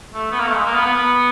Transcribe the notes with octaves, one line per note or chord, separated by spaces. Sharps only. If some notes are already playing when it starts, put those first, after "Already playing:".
A3
B3
A#3
A3
G#3
A#3
B3
B3